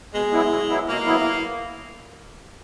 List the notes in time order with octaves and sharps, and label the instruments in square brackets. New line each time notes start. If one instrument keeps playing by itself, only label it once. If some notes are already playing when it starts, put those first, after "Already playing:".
[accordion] B2 [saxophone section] G#3
[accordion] F#3 B3 E4
B2
F#3 B3 E4
[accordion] B2 [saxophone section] A#3
[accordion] F#3 B3 E4